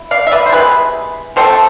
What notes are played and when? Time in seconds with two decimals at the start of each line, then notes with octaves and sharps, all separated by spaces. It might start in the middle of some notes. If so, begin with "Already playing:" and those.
Already playing: E4
0.11 D5 F5
0.27 E5
0.32 B4 D5
0.46 C5
0.52 C3 G#3 B3 E4 G#4 B4
1.36 F3 A3 C4 A4 C5